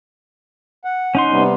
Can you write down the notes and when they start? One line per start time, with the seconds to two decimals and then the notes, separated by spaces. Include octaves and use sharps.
0.85 F#5
1.15 C#4 D#4 C6
1.30 C3 G3 B3